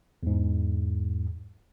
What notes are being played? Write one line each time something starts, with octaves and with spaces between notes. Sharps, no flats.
E2 G#2